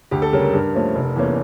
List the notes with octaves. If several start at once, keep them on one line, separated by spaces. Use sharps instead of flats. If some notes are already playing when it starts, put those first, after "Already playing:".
D2 G4
A4
C#3 G3 C#4 A#4
A#4
G2
F3 A3 C#4
F1
E2 E3 A#3 C#4